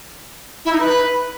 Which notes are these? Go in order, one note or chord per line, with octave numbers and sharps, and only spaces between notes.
E4
D#4
B4